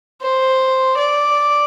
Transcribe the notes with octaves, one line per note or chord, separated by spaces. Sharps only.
C5
D5